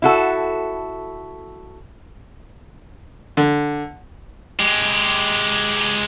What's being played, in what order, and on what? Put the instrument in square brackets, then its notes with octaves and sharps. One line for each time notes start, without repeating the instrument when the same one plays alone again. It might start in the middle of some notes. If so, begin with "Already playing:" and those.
[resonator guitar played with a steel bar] E4 F#4 A4
[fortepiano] D3
[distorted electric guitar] G#3 G4